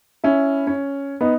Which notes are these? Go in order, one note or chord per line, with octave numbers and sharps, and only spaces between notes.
C#4 E4
C#4
B3 D#4